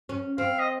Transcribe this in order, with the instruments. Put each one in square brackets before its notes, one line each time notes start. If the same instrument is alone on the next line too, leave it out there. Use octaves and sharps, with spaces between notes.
[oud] C#4
[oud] C4 [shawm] F5
[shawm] D#5